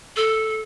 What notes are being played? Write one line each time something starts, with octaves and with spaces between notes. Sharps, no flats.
A4